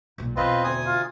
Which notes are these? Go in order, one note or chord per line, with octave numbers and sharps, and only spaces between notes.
B1 A#2
E2 B2 C4 F4 B4 D#5
D2 G#5 D#6
F4